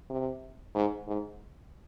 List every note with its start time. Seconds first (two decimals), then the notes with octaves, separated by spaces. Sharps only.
0.10 C3
0.75 G#2
1.08 G#2